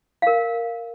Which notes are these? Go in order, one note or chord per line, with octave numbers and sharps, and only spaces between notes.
A#4 F5